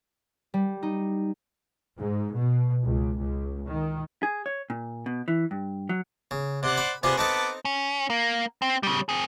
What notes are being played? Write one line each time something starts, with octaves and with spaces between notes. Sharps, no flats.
G3
D#4
G#2
B2
C#2
C#2
D#3
G#4
C#5
A#2
B2
E3
G2
F#3
C#3
C3 C5 D5 F#5
B5
C3 B3 D4 F4 G#4 C5
B3 C4 D#4 A4 A5 D6
C#4
A#3
C4
C#3 G3
C4 G#4